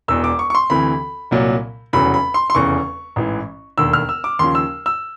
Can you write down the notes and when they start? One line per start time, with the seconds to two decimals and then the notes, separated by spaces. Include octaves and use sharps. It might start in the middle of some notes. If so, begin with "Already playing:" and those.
0.08 E1 E2 B2 E6
0.24 D6
0.39 C#6
0.50 C#6
0.55 C6
0.70 D2 C3 E3 B5
1.31 C2 A#2 F#3
1.93 F1 E2 C#3 F#3 B5
2.14 B5
2.34 C6
2.50 C6
2.55 F1 E2 C#3 C#6
3.16 A1 G#2 E3
3.78 E1 D#2 D3 E6
3.93 F6
4.09 E6
4.24 D6
4.39 D#2 C#3 F3 C6
4.55 E6
4.86 E6